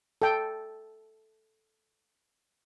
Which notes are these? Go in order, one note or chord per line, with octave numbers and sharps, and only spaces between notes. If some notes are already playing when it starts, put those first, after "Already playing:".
A4 G5